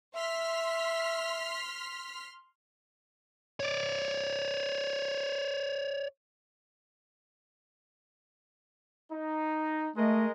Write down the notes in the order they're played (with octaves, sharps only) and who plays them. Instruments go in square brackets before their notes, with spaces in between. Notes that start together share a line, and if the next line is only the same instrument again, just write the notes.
[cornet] E5 [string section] C6 F6 B6
[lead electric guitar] C#5 D5
[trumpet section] D#4
[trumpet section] G#3 A#4 D#5 [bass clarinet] A3